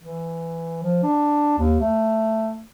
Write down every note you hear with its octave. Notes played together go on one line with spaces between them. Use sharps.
E3
F3
D4
D#2
A3